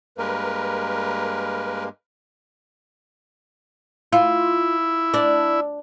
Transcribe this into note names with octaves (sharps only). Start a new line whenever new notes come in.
G2 G#3 A#3 A#4 B4
E4 F4
D4